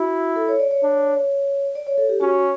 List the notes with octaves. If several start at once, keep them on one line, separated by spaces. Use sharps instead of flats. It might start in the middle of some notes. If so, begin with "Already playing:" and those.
Already playing: E4 F#4
A4
C#5
D5
C#5
D4
D5
C#5
A4
G4
C#4 F#4